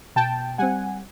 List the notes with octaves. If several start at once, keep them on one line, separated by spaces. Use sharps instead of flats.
B2 G5 A5
G3 C4 F#5 G#5